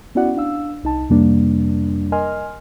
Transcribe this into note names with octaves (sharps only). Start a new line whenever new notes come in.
B3 C#4 E4 F#4 D5 F#5
D4 F5 E6
C2 D#4 A5
F2 C3 G3 A#3 D4
A#4 D#5 G#5 C6 F6